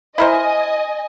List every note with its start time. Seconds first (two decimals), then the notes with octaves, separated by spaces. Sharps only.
0.18 E4 A#4 C5 D#5 G#5